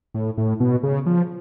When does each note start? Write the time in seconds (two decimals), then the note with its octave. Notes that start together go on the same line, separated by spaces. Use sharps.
0.14 A2
0.38 A2
0.60 B2
0.83 C#3
1.06 F3